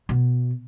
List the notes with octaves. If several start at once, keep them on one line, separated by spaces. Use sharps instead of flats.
B2